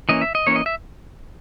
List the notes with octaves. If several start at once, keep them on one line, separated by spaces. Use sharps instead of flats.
E3 A#3 C#4 D#5
E5
D#5
E3 A#3 C#4 C#5
D#5
E5